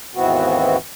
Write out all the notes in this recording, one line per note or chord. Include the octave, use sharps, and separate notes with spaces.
D#2 G#2 E3 B3 C4 F#4